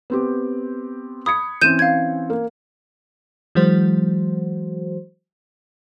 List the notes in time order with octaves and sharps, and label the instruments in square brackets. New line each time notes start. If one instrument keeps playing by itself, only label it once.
[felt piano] B3 C4 G4
[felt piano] B5 G#6 C#7 [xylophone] D#6
[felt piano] E3 C4 C#4 [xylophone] G6 D#7 E7
[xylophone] F5 G#6
[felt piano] A#3
[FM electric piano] E3 F#3 G#3 F#4 C5